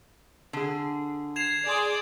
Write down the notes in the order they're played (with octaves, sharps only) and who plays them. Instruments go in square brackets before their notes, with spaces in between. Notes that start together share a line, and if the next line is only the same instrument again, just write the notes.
[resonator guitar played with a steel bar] D3 G#4
[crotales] G#6 E7 F7 [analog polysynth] C7
[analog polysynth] G#4 C6 [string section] D5